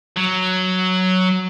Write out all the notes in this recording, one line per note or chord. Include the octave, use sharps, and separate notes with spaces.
F#3